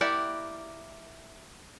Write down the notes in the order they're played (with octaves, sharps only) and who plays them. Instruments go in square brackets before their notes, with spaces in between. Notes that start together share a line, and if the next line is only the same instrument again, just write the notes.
[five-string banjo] A#3 E4 G4 D5 F#5